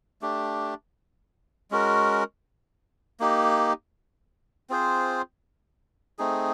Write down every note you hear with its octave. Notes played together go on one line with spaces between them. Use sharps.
A3 D4 G4
G#3 C#4 F#4 A#4
A#3 D#4 G4
C4 F4 G#4 C5
A3 C4 D#4 G#4